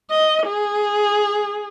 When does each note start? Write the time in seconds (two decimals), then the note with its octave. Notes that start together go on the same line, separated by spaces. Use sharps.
0.10 D#5
0.46 G#4